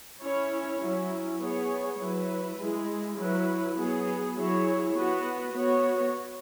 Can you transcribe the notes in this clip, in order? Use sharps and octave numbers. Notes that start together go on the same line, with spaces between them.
C#4 E4 C#5
F#3 C#4 E4
B3 G#4 C#5
F#3 E4 B4
G#3 E4 G#4
F#3 E4 B4
F#3 B3 G#4
F#3 E4 G#4 C#5
B3 F#4 B4
B3 F#4 C#5